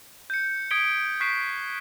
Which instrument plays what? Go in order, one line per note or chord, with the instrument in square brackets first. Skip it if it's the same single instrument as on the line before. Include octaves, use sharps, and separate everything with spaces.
[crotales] G6 C#7
D#6 G#6 B6 D7 G7
C#6 F#6 B6 C7 D7 E7